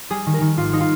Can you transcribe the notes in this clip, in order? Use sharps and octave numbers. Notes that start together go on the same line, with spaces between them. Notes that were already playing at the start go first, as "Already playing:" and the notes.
G3 G#4
D#3
A#4
D#3
G#1 F4
G3 D#4
F4